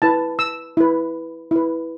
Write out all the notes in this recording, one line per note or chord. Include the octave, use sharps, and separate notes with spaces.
E4 B4 A5
E6
E4 B4
E4 B4